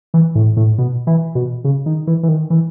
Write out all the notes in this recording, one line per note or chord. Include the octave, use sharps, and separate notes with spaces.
E3
A2
A2
B2
E3
B2
C#3
D#3
E3
E3
D#3
E3